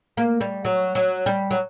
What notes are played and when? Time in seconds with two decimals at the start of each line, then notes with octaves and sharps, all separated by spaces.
0.17 A#3
0.41 G3
0.65 F#3
0.95 F#3
1.26 G3
1.51 F#3